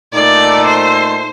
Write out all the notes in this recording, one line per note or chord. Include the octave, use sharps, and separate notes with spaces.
A#2 A3 D#4 A4 D5
C5